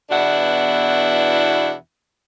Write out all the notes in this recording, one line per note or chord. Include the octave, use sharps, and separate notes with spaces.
E2 B2 D4 E4 F#4 F#5